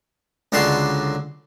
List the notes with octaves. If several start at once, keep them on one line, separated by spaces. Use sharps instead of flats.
C#2 D3 F#3 A5 C6